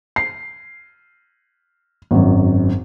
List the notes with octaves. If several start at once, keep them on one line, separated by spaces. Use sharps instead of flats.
C7
G#1 F#2